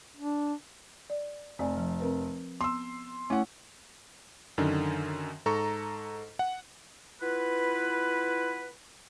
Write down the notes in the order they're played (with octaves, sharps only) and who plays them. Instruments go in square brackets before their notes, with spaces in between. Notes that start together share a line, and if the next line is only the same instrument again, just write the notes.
[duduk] D4
[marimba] D5
[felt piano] F1 [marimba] C4 D5 G#5
[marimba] F3
C4 A#4 B4
[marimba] B3 [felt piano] C6 E6
[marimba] A3 E4 [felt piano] C#4 F#5
[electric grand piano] F#2 D3 D#3
G#2 A4 A#5 C#6
F#5
[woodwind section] B3 E4 F4 B4